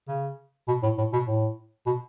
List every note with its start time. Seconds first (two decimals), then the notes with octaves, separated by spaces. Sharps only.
0.08 C#3
0.68 B2
0.82 A2
0.98 A2
1.13 B2
1.27 A2
1.86 B2